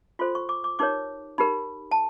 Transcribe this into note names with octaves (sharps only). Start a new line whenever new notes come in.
F4 A4 C5 C6
C#6
D6
D6
D#4 G4 A#4 C#5 D6
D#4 G4 A#4 B5
A5